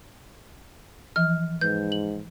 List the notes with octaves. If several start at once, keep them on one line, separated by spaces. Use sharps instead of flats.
E3 F3 F6
G#2 B4 G6
F#7